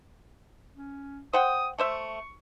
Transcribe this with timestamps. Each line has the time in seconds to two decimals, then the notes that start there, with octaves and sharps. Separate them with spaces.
0.76 C#4
1.33 C5 F#5 G5 D#6
1.79 A3 C5 E5 C#6